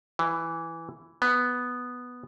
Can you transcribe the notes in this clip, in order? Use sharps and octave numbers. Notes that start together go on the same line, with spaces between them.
E3
B3